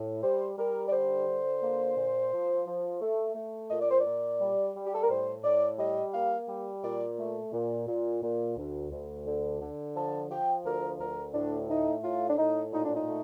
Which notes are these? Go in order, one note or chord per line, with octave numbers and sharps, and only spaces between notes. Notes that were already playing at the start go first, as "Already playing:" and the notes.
Already playing: A2
G3 C5
G3 A#4
D5
D3 C5
D3
A#3
A#2
F3
F3
A3
A3
A#2 D#5
D5
C5
D5
A#2
G3
G3
G4
A4
A#4
A2 C5
A2 D5
G3 D#5
A#3 F5
G3
A#2 D5
A3
A#2
A#2
A#2
D2
D2
D3
D3
F3 A5
F3 G5
D2 A#4
D2 A#4
A2 D4
A3 D#4
A2 F4
D4
A2 D#4
A#2 D#4
D4
D#4
A3